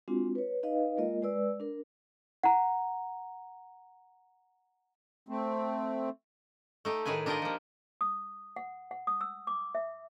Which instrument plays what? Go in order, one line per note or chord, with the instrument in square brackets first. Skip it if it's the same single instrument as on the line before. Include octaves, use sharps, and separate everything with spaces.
[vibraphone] G#3 C4 D4 F4 F#4
B4 C#5
D#4 B4 D#5 F5
G#3 A#3 F4 A#4 D#5
G#3 B4 D5 E6
D4 A#4
[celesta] F#5 A#5
[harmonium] A3 C4
[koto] A3 D#4 G4
A2 D#3 G#4 B4 G#5
D4 D#4 F4 G4 A#4 D#5
F3 A#3
[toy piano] D#6
F#5
F#5
D#6
E6
D6
E5